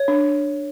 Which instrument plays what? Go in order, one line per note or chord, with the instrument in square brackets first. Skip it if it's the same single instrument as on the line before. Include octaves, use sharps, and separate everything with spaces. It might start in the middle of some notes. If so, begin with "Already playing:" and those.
Already playing: [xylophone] C#5
[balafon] D4